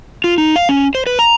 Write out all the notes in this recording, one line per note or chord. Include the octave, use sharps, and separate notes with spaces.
F4
D#4
F5
C#4
C5
B4
A#5